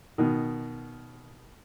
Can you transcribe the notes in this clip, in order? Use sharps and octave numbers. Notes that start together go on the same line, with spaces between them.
B2 D#3